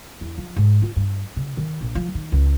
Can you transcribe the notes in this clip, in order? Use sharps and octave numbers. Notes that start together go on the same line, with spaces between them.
E2
F3
G#2
F4
G2
C#3
D#3
A#1
F3
D#3
C#2